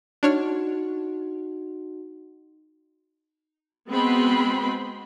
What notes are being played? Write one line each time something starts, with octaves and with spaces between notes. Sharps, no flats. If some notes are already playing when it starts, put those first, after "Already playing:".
D4 D#4 F#4 C#5 F6
G#3 B3 C4 F#4 B5 C6